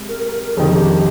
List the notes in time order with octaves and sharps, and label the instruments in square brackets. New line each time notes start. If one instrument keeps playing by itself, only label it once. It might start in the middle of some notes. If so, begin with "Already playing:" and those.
Already playing: [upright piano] C3 G#3
[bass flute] A#4
A#4
A#4
[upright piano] G1 F2 C3 D#3 [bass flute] G#4
[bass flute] G4